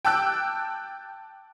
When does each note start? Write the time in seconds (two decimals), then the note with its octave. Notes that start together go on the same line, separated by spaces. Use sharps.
0.05 G5 A5 D6 E6 F#6